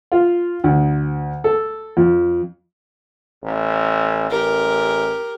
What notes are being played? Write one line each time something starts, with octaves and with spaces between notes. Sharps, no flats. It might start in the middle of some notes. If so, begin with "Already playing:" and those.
F4
D2
A4
F2
A1
A1 G4 A#4